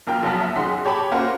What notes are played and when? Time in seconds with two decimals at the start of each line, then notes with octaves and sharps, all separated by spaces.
0.07 A#1 A#3 F4 G5 A#5 F6
0.23 A#1 F#2 F#3 B3 A5 B6
0.41 E5
0.56 F#2 D#3 F#4 G#4 C6 B6
0.85 G4 C#5 A5 B5 D6
1.11 A#3 C#4 F4 F#4 A#4 C5